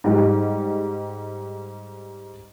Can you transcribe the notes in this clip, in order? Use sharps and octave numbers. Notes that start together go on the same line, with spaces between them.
G#2 G3